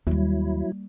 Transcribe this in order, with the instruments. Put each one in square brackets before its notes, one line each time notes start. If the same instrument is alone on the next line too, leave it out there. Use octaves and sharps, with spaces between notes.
[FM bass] D#2 [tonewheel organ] F#3 E4 [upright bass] G3 A#3